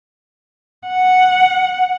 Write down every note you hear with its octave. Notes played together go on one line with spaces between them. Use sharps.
F#5